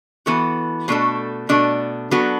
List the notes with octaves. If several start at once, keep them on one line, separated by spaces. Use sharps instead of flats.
E3 B3 F#4 A4
B2 A3 D4 A4
B2 A3 D4 A4
F#3 B3 D4 F#4 A4